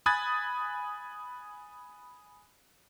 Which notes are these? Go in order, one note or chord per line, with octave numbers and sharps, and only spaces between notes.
G#5 B5 D#6 F#6 G#6 A6